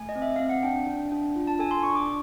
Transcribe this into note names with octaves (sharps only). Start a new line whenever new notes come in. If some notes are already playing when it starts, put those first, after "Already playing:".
Already playing: A3 G#5
D#5
C4
E5
C4 F5
F#5
D4 G5
D4
D4
F4
A5
A4 G#5
C6
D4 C#6
D6
D4